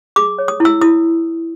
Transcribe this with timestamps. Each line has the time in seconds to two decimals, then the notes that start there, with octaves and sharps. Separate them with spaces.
0.16 G#4 D6
0.38 C#5
0.48 D#6
0.60 E4
0.65 E6
0.81 E4 D#6